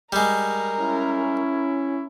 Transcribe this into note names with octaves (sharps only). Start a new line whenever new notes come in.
G3 G#3 A#4
C#4 E4